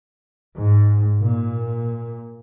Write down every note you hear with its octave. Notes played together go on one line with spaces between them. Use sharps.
G#2
A#2